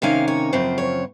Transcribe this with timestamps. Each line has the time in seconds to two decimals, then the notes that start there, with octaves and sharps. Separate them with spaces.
0.02 C3 D#3 A#3 C#4 F5
0.28 C#5
0.53 F#2 C#3 F3 C4 C5
0.78 C#5